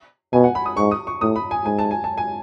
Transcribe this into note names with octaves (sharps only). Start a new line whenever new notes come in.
B2 G#5
F#5
B5
D#6
G#2 C#6
D#6
C#6
A2 D#6
B5
G#5
G#2 G#5
A5
G#5
A5
G#5